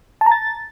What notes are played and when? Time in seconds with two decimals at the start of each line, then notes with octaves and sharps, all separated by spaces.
0.21 A5
0.26 A#5
0.32 A6